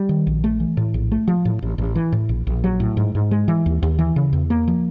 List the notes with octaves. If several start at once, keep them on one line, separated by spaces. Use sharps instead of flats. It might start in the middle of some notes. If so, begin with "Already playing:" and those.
Already playing: G3
D#3
A#1
A3
E3
A2
A#1
A3
F3
A2
A1
A1
E3
A2
A#1
A#1
F#3
A2
G#2
G#2
G#3
E3
D#2
D#2
E3
C#3
E2
A#3
F3